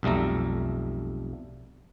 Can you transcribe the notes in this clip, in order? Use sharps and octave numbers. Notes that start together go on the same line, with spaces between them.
B1 F2 G3 A3 A#5